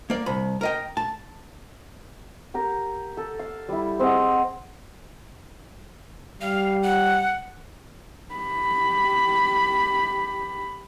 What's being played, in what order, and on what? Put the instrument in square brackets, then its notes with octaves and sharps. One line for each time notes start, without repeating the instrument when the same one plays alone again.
[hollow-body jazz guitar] A#3 D5
C2 B5
A#4 D#5 G5
A5
[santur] G4 A#4 A#5
A4
F5
G3 E4
C4 G#4 D#5 F#5
[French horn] G3 [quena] F5
[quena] F#5
[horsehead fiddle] G4 B5